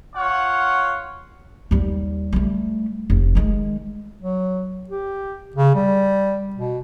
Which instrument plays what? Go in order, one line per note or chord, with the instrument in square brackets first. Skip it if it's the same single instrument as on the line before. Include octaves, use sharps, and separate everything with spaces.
[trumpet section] F4 C#5 F#5
[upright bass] D#2 G3
G3 A3
F1
D#3 G#3
[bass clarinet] F#3
G4
C#3
G3
B2